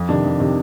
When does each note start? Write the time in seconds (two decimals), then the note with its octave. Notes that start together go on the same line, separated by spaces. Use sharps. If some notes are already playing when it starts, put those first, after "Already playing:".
Already playing: F2
0.09 C3 D#3 D4
0.24 F2
0.40 C3 D#3